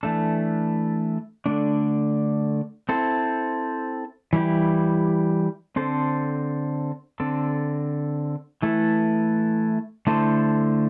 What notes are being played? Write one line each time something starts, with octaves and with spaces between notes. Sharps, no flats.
E3 A3 D4 A4
D3 A3 D4
C4 E4 A4 C5
E3 G3 E4 G4
D3 C4 A4 C5
D3 C4 A4
E3 A3 E4 A4
D3 A3 E4 A4 C5